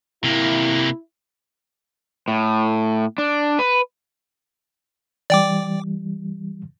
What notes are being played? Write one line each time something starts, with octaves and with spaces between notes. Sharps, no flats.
C3 A#3 E4
A2
D4
B4
E3 G3 D5 G5 D6